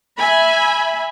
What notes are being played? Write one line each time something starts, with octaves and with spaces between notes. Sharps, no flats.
E5 G#5 B5